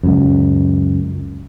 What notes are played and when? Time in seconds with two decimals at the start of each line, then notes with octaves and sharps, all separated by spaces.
0.03 C#2 F#2